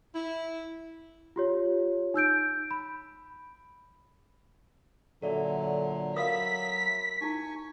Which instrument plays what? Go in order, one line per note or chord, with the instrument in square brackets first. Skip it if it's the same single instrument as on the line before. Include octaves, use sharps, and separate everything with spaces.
[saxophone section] E4
[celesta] F4 G4 C#5
D#4 E6 G6 D7
B5
[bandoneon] A#2 D3 F#3 [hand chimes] A4 D5 E5
[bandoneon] F#3 E5 B5 [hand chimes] A#4 [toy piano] F5 D#6 [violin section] B6
[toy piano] D#4 E4 [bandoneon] G#5 C#6